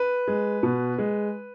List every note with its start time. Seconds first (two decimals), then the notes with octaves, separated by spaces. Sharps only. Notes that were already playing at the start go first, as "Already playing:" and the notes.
Already playing: B4
0.28 G#3
0.63 B2
0.98 G#3